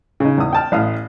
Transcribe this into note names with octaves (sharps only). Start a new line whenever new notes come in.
C#3 D#4
E2 D#6
G5 A5 F6
A1 F5 D#6